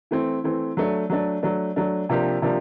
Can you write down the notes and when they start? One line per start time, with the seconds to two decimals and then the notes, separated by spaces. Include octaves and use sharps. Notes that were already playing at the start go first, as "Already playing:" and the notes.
0.11 E3 A3 C4
0.44 E3 A3 C4
0.77 F#3 A3 D4
1.10 F#3 A3 D4
1.43 F#3 A3 D4
1.76 F#3 A3 D4
2.09 C3 F3 A#3 D4 G4
2.42 C3 F3 A#3 D4 G4